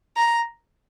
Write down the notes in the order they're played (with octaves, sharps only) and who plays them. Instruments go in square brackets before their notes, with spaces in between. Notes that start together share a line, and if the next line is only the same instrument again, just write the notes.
[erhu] A#5